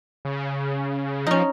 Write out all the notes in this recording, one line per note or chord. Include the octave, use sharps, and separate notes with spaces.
C#3
F3 C#4 D#4